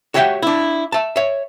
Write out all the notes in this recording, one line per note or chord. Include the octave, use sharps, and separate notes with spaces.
F#4 G4 C#5 E5 F#5 G5
D4 E4
E5 A5
C#5 E5